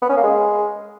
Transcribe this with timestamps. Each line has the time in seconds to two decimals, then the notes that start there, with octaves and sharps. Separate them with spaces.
0.02 B3
0.09 C#4
0.17 A#3
0.24 G#3